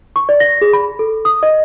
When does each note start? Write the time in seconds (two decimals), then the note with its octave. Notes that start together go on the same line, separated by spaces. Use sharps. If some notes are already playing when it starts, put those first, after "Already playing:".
0.16 C#6
0.29 D5
0.40 A#6
0.61 G#4
0.73 B5
0.99 A4
1.25 D#6
1.43 D#5